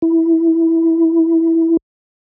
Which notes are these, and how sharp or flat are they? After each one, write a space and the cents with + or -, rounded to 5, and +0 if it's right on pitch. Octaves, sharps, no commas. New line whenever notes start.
E4 -5